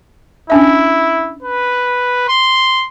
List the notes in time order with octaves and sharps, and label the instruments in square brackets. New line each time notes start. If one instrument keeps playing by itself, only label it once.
[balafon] C#4 D4 E5 [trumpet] E4
[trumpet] B4
C6